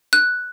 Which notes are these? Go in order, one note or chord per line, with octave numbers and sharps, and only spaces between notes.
F#6